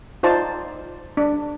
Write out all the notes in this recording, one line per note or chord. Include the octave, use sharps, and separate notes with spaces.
D#4 F4 C5 D5 A5
D4